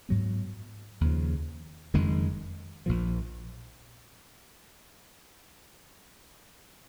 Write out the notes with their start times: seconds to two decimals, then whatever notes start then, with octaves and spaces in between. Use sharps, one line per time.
0.09 G#2 F#3 B3
1.01 D#2 C#3 F3
1.94 F#1 F2 D#3 G#3
2.86 A#1 A#2 F3